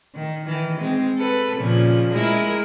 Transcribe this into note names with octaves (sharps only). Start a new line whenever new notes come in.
D#3
D#3 E3
G#3 C4
A4 B4
A#2 C#3 F3
G#3 E4 A#4